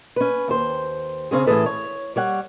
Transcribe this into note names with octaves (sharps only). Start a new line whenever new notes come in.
C#4 B4
D#2 C5
C#3 C4 C#4 G#4
A2 E3 G#3 G#4 A4 B4
C#5
G3 C#5 F#5